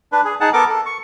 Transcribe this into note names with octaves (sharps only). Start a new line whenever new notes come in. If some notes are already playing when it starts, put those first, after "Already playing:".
D4 B4
G#4
D#4 G#4 F#5 A5
B3 A4 A#4 D6
A4
C#6